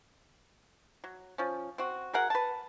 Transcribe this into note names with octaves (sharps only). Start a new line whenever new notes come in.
F#3
F3 C#4
C4 F#4
F#4 G#4 A#4 F#5
B4 A5